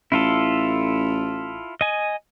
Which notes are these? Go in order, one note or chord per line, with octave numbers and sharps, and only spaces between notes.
A1 E4 F4 A4
D#5 G#5